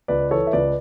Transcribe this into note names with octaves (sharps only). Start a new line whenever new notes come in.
C#2 B4 D5
E3 A4 C#5
E5
C#2 B4 D5